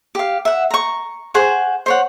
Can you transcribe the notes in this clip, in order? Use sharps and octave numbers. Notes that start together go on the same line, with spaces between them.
G4 F5
E5 F#5
A#5 C#6
G#4 C5 F#5 C#6
C5 C#5 F#5